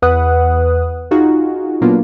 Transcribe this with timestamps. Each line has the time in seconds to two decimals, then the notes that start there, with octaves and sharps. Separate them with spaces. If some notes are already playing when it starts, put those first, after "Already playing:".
0.02 E2 B4 F#5 D#6 F#6
1.11 D#4 F4 F#4 G#4
1.81 A#2 F#3 A#3 B3 D4 F4